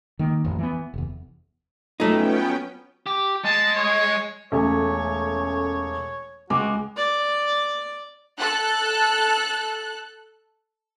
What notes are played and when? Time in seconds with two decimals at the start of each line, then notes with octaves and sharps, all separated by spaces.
0.19 D#3 A#3
0.44 A1 F2
0.58 E3 B3
0.94 F1 E2
2.00 F3 F#3 A3 B3 C#4 D#4 G5
3.06 G4
3.44 G#3 A5
3.76 C#5
4.52 E1 A3 C#4 C#5
6.50 C#2 G#3 F#4 D6
6.97 D5
8.38 A4 F#6